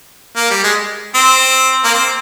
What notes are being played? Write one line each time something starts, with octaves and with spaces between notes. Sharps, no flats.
A#3
G3
G#3
C4
A#3
C4